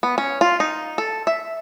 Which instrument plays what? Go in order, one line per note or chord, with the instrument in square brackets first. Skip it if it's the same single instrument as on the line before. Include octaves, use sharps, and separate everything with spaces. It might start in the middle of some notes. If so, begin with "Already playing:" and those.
[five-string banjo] B3
C#4
F4
D#4
A4
E5